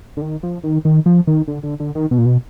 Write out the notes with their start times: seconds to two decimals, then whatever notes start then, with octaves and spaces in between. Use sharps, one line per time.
0.17 D3
0.22 D#3
0.43 F3
0.64 D#3
0.85 D#3
1.06 F3
1.27 D#3
1.48 D3
1.63 D3
1.80 D3
1.95 D#3
2.11 B2
2.18 A#2
2.25 B2